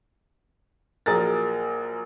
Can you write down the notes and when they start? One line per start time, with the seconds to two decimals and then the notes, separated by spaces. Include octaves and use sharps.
1.06 A#1 F#3 G#4 A#4 A6